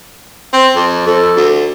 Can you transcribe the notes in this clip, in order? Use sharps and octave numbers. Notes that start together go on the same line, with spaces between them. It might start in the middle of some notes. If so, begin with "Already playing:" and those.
C4
F2
F2 A4
D2